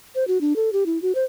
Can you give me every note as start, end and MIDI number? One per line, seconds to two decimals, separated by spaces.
0.15 0.27 72
0.28 0.40 66
0.41 0.55 62
0.56 0.72 69
0.73 0.84 67
0.86 1.00 64
1.02 1.12 66
1.15 1.25 72